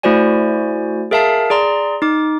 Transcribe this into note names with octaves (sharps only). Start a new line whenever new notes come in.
A3 E4 F#4 C5 D5 G#5
G#4 A#4 E5 F5 A5 C7
G#4 D5 A#5 C6
D#4 D6